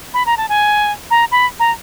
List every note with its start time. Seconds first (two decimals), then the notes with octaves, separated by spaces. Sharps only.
0.14 B5
0.26 A#5
0.37 A5
0.49 G#5
1.10 A#5
1.31 B5
1.59 A#5